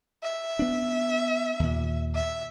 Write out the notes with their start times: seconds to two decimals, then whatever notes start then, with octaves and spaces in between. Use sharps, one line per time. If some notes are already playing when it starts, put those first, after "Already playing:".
0.23 E5
0.59 B3 D4
1.60 D#2 A#2
2.15 E5